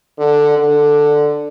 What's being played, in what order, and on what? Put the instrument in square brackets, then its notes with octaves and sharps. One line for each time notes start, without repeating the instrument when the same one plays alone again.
[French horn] D3
D3